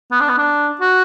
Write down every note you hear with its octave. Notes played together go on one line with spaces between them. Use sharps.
B3
D4
B3
D4
F#4